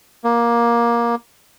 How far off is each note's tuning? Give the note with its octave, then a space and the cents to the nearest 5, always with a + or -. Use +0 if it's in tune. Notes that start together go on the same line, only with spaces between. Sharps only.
A#3 +15